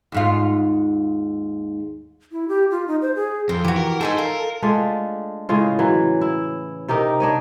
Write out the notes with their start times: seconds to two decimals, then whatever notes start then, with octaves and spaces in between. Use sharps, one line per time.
0.12 D#2 G#2 F4
2.32 E4
2.48 G4
2.71 F4
2.87 D#4
3.02 C5
3.15 G#4
3.49 F2 C5
3.64 E3 F#4 G4
3.77 A#4
4.01 D#4 G#4 A4 C5 E5 G#5
4.18 F4 A#4
4.62 G#3 A3 D4 F4
5.49 A2 C#3 G#3 F4
5.79 E3 F#3
6.21 E4
6.89 C3 D#4 G4 A#4
7.20 D4 C#5 D#5